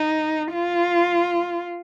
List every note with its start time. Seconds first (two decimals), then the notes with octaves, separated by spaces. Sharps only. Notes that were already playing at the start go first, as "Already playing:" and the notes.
Already playing: D#4
0.53 F4